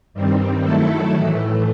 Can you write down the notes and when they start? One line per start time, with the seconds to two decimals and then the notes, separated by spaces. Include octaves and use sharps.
0.14 G2 D#3 G3 C4
0.62 D#3 F#3 A3 E4 A4
1.11 A2 E3 A3